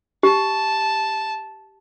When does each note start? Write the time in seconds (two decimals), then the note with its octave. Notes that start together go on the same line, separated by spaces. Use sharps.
0.23 G4 A5